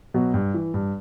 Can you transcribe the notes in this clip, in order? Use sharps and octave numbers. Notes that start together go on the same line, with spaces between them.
B2 F#3
G2
E3
G2